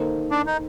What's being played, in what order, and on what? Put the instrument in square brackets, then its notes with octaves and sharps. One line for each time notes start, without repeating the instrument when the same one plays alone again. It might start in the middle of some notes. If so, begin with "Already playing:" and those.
Already playing: [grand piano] D#3 A#3 D#4 A4 C5
[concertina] D4
D#4